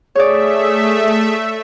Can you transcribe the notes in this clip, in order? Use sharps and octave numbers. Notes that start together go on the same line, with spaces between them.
A3 G#4 C#5 D5 E5